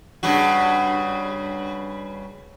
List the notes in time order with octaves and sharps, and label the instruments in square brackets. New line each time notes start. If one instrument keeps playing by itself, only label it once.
[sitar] G2 C#3 F#4